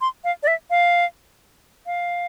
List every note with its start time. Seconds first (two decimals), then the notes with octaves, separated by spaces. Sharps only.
0.01 C6
0.24 F5
0.43 D5
0.47 E5
0.70 F5
1.86 F5